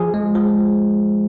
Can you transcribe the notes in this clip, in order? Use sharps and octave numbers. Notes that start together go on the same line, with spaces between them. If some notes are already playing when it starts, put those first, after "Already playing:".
Already playing: F3 G#4
G#3
F3